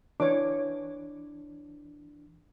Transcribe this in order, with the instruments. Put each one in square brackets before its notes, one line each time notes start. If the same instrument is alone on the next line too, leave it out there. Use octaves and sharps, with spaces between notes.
[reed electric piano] E3 D4 [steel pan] C#5 D6